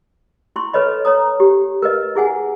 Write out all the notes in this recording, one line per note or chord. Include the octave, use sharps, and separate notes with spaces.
E4 C6 C#6
A4 B4 C#5 D#5 B5
C#5 A#5 D#6
G4
A#4 B4 D#5
E4 G#4 F#5 G#5